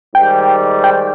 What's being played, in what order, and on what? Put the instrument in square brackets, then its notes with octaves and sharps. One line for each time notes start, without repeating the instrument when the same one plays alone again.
[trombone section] G#2 D#3 G3 [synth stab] G5
[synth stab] G5